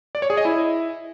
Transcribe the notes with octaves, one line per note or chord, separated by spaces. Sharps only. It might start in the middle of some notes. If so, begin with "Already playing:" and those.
D5
C#5
G#4
D#5
E4